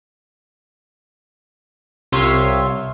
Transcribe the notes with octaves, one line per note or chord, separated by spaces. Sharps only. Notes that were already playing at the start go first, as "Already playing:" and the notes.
C2 C3 F4 C#5 E5 C6